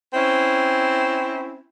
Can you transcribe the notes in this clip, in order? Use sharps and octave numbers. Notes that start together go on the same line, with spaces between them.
C4 C#4 E4